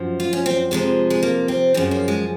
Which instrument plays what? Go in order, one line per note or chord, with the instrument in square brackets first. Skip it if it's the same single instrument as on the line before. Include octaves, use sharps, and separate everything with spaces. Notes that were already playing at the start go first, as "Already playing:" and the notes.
Already playing: [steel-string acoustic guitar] F#2 F3
F4
C#4
C4
F2 C3 F3 G#3
G#3
A#3
C4
F#2 C#3 F3
A#3
G#3